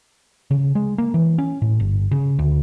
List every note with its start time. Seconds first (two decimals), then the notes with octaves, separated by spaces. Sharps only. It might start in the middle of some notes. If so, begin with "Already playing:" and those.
0.51 C#3
0.75 G#3
0.98 A#3
1.14 E3
1.38 C#4
1.62 A2
1.80 G1
2.11 C#3
2.39 D2